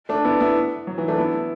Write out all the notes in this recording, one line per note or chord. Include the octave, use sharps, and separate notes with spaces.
A3 D4
B3 E4
B3 E4
F#3
E3
A3 D4
B3 E4